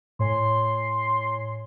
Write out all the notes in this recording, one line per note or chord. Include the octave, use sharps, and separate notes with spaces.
A2 C#5 G#5 C6